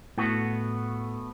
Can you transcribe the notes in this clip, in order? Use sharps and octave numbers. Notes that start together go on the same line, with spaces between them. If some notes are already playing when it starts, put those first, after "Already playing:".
A2 A3 B3 F#4